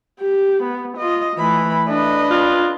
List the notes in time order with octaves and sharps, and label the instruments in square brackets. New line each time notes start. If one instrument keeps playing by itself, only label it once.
[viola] G4
B3
F4 D#5
[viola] E3 A3 [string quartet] B5
[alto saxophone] A3 [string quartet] D4 [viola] B4 D#5
[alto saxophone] F4